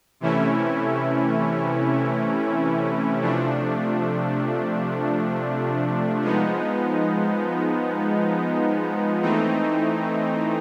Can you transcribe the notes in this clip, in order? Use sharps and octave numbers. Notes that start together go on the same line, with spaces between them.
C3 E3 A3 C#4 E4
C3 F3 A3 D4
F3 G#3 B3 D#4
E3 A3 C4 D#4